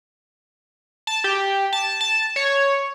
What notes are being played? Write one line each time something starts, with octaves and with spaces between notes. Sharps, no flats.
A5
G4
A5
A5
C#5